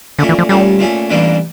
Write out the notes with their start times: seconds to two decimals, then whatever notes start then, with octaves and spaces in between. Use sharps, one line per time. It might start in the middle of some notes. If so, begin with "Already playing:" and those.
0.19 A#2 D3 A3 C#4
0.29 E3
0.39 F3
0.49 A#2 G3 A3 C#4
0.79 A#2 A3 C#4
1.10 A1 G2 E3 G3 A#3